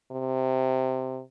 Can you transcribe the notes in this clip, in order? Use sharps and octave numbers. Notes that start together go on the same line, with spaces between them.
C3